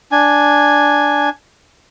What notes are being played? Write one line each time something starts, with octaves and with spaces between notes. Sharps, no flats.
D4 G#5